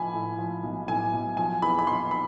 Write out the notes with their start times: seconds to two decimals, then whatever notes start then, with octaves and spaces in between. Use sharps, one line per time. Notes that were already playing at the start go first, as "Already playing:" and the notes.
Already playing: A2 F3 G#5 B5
0.14 A2
0.38 F3
0.63 B1
0.88 A2 G#5
1.13 B1
1.37 F3 G#5
1.62 E2 B5
1.79 B5
1.87 F3 C6
2.11 B5